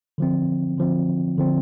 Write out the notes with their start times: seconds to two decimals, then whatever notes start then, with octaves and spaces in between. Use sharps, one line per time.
0.18 D3 F3 C4
0.78 D3 F3 C4
1.38 D3 F3 C4